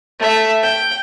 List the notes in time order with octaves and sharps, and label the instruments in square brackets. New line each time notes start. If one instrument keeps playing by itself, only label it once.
[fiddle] A3 E5
G5